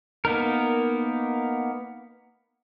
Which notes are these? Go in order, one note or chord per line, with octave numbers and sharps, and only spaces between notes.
A#3 B3 D#4 A#4